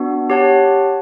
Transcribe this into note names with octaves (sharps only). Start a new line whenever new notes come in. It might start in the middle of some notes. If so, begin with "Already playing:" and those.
Already playing: B3 D4 F#4
G4 C#5 F#5 A5